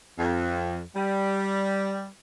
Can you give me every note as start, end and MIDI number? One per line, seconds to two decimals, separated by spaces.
0.18 0.80 41
0.95 2.06 55